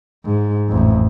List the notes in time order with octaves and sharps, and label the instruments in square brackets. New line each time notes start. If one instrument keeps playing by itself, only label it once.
[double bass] G#2
A1 F2